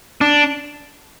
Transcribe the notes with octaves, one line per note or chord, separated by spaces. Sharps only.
D4